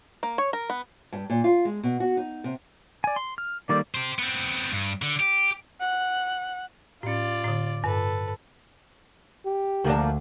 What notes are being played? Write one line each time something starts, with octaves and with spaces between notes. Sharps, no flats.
A#3
C#5
A#4
B3
G2
A#2
F4
G#3
B2
F#4
D#4
C3
D5 G#5
C6
F6
D#3 G3 A#3 A4 C5 D5
G4 C5
B3 C4
G2
D3
G4
F#5
A2 C#4 F4 D5
A2 D3
G2 A4 B4
G4
D2 F3 A#3 D4